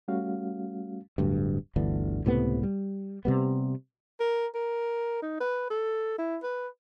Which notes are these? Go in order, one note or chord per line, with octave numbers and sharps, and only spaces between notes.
G3 A3 C#4 F#4 F5
D1 D2 G2
G1 D2 D3 E3
C#2 A2 C3 B3
G3
C3 G3 B3
A#4
A#4
D#4
B4
A4
E4
B4